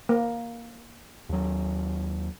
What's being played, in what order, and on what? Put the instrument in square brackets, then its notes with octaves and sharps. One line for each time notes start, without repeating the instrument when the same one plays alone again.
[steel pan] A#3
[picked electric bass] D#2 F#3